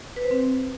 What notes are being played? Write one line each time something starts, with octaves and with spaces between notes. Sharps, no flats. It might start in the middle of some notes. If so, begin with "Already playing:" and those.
B4
C5
C4